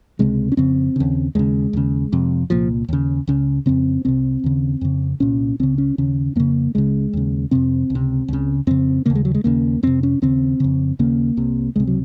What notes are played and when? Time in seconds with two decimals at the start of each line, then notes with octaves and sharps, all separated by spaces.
0.19 C#2 C3 G#3
0.52 C#4
0.57 F2 C#3 C4
0.96 D#2 C#3
1.35 D#2 C#3 G#3
1.73 D#2 C#3
2.12 F2 C3
2.50 C2 A#2 F3
2.88 D#2 C#3
3.27 C#2 C#3
3.66 F2 C#3 C4
4.05 C2 C3 C4
4.44 D#2 C#3
4.81 F2 C#3
5.20 C2 A#2 C#4
5.60 C#2 C#3 C4
5.78 C#4
5.98 D#2 C#3 C#4
6.36 F2 C#3 A#3
6.75 C#2 C#3 G#3
7.13 D#2 C#3
7.51 F2 C3 C4
7.90 C#2
7.95 C3
8.28 C#2 C#3
8.67 F2 C#3 C4
9.06 D#2 C#3 A#3
9.15 G#3
9.25 F#3
9.34 G#3
9.44 D#2 C#3 A#3
9.83 F2 C3 C4
10.03 C#4
10.22 D#2 C#3 C4
10.60 F2 C#3
10.99 D#2 C#3 A#3
11.37 C2 C3
11.76 C#2 C3 G#3
11.87 F#3